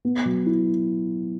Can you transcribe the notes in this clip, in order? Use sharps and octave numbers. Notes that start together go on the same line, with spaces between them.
B3
F#3
E4